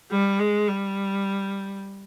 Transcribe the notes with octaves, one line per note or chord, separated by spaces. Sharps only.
G3
G#3
G3